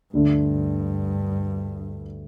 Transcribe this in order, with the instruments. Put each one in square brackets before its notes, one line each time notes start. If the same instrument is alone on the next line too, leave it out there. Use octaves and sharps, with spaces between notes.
[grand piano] D2 D3 A3 [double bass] G2